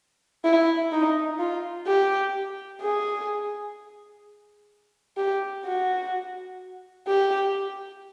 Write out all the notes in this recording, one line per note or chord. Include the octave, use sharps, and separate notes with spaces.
E4
D#4
F4
G4
G#4
G4
F#4
G4